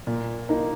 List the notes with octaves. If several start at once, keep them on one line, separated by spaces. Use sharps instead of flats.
A#2
A#3 D#4